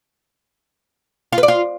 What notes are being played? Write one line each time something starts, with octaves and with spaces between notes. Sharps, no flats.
F4
B4
D5
F4